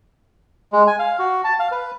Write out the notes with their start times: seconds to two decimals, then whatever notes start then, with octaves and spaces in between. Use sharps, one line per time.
0.73 G#3
0.87 G#5
0.99 F5
1.19 F#4
1.44 A5
1.59 F5
1.72 B4